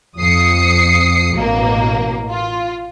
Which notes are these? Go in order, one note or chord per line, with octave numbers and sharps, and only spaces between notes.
F2 D#6 C7 C#7
A1 B2 A#3
F4